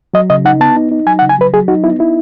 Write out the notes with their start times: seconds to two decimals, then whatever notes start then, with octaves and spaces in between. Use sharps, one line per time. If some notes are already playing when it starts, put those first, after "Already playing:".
0.14 F#3 D#5
0.30 C#3 D#5
0.45 D#4 F#5
0.60 B3 A5
0.76 D#4
0.92 D#4
1.06 F#3 G#5
1.19 F#5
1.22 C#3
1.29 G#5
1.38 F#3 B4
1.53 F#3 G#4
1.68 D#4 F#4
1.84 B3 E4
1.99 D#4 E4